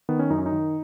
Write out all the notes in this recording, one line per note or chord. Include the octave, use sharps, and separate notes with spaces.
D#3 B3
C#4
F#2 D#4
C#4
D#4
D#3